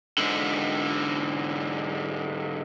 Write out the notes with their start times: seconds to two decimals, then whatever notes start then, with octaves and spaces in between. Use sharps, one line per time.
0.18 G#2 D3